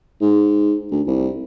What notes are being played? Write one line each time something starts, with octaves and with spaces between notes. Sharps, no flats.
G#2
D2
C2